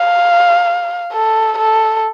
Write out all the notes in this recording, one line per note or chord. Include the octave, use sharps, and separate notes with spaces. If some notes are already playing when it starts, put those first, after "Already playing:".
Already playing: F5
A4
A4